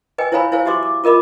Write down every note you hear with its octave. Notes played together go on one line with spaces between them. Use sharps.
B4 D#5 G5 G#5
E4 C5 C#5 F5 G#5 B5
E4 C5 C#5 F5 G#5
F#4 G4 C5 E5 C6 D6
D6
F4 A#4 D#5 B5 D6